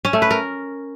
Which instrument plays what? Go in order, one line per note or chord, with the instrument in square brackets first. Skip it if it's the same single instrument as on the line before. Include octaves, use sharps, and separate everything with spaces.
[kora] C#4
A3
B4
A#4